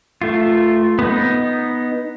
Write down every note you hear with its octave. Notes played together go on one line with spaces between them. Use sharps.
A3 F4
B3 D#4